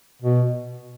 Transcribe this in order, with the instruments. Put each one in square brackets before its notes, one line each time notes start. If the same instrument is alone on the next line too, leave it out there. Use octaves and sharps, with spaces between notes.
[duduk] B2